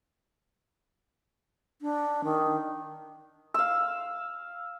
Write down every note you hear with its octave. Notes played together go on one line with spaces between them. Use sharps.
D4
D#3
F5 E6